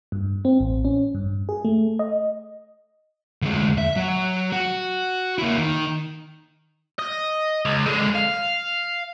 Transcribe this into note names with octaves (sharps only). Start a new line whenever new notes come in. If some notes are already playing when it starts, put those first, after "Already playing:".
G2
C4
A1
C#4
G2
G#4
A3
D#5
D2 G#3
E5
F#3
F#4
A#3 E4
D#3
D#5
C#2
D3 G#3
F5